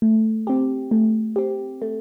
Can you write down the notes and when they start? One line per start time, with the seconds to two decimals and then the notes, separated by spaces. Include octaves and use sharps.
0.02 A3
0.47 C4 G4
0.91 A3
1.36 C4 G4
1.82 A3